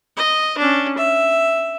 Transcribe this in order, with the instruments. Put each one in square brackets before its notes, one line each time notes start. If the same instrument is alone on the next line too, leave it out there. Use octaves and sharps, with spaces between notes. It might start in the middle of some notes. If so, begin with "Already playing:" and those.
[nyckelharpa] D#5
C#4 D4
E5